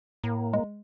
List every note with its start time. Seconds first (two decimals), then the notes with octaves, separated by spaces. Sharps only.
0.24 A2 A#3
0.53 G#3